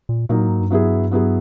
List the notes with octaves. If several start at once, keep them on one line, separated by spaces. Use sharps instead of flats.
A#2
A#2 F#3 A#3 D#4
A2
G#2
G2
F#3 B3 E4 G#4
F#3 B3 E4 G#4